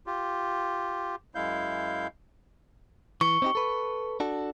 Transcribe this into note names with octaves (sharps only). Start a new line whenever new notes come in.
F4 G4
F#2 G#3 E4 F5 G6
E3 C#6
C4 D#4 G4
A4 B4
D4 F#4 A4